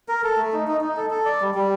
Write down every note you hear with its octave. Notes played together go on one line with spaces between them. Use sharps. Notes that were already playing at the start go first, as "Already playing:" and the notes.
A#4
A4
A3
D#4
D#4
D#4
A4
A4
D5
G3
G3